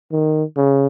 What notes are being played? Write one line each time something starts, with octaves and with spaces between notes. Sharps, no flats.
D#3
C#3